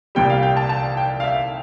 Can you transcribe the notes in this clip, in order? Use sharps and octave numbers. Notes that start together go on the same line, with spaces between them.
C2 A#2 G3 G5
F5
G5
A5
A5
G5
F5
E5